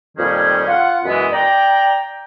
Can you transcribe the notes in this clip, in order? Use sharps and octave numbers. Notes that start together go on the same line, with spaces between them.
F2 A#2 D#3 G3 C#4 G#4
F4 F#5
F#2 B2 E3 G#3 B3
D5 G5 A#5